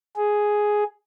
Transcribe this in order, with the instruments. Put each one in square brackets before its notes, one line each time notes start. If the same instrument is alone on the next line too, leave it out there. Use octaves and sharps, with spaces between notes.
[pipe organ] G#4